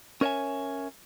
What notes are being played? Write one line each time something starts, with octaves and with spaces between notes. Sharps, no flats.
C#4 A#4 C#5 D#5 E5 G#5